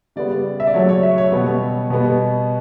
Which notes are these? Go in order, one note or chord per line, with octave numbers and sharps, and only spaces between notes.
C#3 G3 B3 D5
E5
D5
C#3 F#3 A3 C#5
C#5
E5
C#5
B2 G3 B3
B2 G3 B3